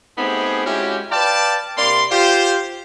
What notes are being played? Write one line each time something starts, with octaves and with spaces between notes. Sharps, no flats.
A3 B3 C4 D#4 G4 G#4
G#3 C#4 E4 F#4 G4
B4 D5 F5 G5 A5
C3 A#3 D5 B5 C6
F4 G4 C5